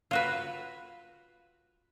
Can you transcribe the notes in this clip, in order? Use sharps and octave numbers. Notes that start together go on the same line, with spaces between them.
F4 F#4 B4